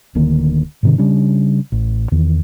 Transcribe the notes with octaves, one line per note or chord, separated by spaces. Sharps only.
D1 D2 D#3 A#3
G#2 C3 D#3
C#3 G3 C#4 D4
A1
E2 D#3